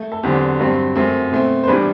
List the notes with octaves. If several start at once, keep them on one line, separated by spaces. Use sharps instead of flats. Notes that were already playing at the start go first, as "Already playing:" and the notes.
Already playing: A3
A4
E2 D3 F#3 C4 G4
G2 F#3 C4
F#2 F#3 A3 C4
B2 A3 C4
C5
A2 E3 G3 B3 D4 B4